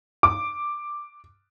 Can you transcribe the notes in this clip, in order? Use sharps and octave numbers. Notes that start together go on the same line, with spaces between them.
D6